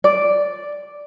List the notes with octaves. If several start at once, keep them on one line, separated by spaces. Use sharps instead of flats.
D5